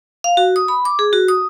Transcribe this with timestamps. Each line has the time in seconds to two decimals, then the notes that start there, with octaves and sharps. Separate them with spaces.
0.24 F5
0.37 F#4
0.56 D#6
0.68 B5
0.85 D6
0.99 G#4
1.13 F#4
1.28 D#6